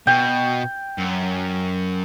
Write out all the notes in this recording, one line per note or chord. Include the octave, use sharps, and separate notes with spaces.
B2 G5
F#2